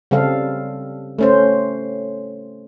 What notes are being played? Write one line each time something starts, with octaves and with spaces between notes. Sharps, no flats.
C#3 G3 C4 A4 F5
A3 C#4 C5